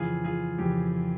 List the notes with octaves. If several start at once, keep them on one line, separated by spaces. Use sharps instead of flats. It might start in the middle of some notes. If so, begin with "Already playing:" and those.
Already playing: F2 C#3 E3 F4 G#4
F4 G#4
F2 C#3 E3 G4